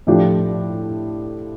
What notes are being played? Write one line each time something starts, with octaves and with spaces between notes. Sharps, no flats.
A2 F3 A3 D4 G4